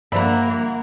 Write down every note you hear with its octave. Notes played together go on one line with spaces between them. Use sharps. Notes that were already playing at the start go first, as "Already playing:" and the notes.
G2 D3 F3 A#3 E5 F#5 A#5 B5